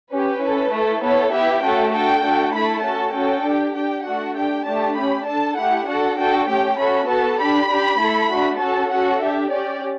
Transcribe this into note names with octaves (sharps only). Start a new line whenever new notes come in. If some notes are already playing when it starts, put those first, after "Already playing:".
C#4 G4 B4
C#4 E4 A4
A3 E4 A4
B3 E4 A4 C#5
B3 E4 G4 E5
A3 C#4 F#4 A4 G5
D4 F#4 A4 G5
A3 D4 F#4 A4
A3 E4 A4 B5
C#4 F#4 A4 A5
C#4 F#4 A4 G5
D4 G4
D4 G4 G5
A3 D4 F#4 A4 F#5
D4 G4 G5
A3 D4 G4 A5
C#4 G4 B5
D4 A4 A5
A3 E4 G4 F#5
D4 F#4 A4 F#5
D4 F#4 A4 G5
A3 C#4 G4 G5
C#4 F#4 A4 B5
B3 F#4 A4 A5
D4 G4 B5
D4 G4
A3 E4 A4
A3 D4 F#4
C#4 F#4 A4 A5
C#4 F#4 A4 F#5
D4 G4 E5
C#4 G4 D5